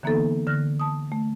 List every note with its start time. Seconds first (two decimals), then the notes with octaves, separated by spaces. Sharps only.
0.03 D3 E3 A#3 B3 D#4 A4
0.47 D3 F6 F#6 A#6
0.80 A5 D#6
1.12 A3